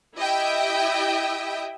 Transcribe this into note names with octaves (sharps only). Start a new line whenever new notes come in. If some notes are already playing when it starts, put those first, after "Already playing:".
E4 G4 D#5 E5 G5